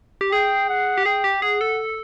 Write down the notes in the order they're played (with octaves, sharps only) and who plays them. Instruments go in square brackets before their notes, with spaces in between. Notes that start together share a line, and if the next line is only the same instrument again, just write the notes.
[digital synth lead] G4
[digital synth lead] G#4 [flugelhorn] G5
[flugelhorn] F#5
[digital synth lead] G4
[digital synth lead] G#4 [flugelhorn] G5
[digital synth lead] G4
[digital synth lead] G#4 [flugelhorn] F#5
[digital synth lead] A4